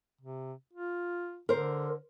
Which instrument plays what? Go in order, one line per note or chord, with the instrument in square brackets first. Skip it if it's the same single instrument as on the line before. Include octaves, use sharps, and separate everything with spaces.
[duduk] C3
F4
[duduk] D3 [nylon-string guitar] A#4 C5